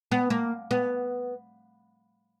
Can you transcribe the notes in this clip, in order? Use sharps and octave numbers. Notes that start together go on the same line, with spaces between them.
B3
A#3
B3